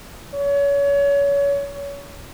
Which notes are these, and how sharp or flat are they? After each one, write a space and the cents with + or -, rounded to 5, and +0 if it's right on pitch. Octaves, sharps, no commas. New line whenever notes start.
C#5 +30